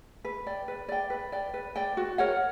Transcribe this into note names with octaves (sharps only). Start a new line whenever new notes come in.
B4
D5 G5
B4
D5 G5
B4
D5 G5
B4
D5 G5
F#4
A#4 C#5 F#5